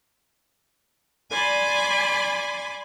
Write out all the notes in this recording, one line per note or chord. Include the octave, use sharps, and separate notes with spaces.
D5 G#5 B5 C6 D6